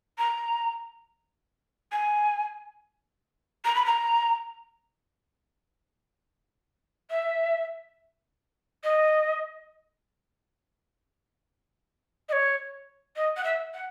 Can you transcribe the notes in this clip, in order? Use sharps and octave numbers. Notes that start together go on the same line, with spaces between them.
A#5
G#5
A#5
B5
A#5
E5
D#5
D#5
C#5
D#5
F#5
E5
F#5